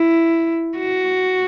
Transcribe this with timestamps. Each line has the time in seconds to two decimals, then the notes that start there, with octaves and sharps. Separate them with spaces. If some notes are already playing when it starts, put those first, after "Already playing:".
Already playing: E4
0.78 F#4